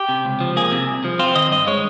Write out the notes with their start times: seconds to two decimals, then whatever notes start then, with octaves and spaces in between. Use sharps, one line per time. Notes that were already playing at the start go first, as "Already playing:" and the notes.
Already playing: G4
0.09 C3
0.25 C#2
0.40 F3
0.57 A#3 G#4
0.72 C3
0.87 C2
1.04 F3
1.19 C4 F4
1.35 D#3 D#5
1.52 G2 D#5
1.67 G#3 C#5